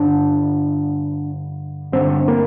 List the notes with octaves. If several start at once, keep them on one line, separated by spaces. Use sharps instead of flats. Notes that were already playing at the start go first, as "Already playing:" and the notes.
Already playing: G2 D3 D4
G2 D3 C4
A#3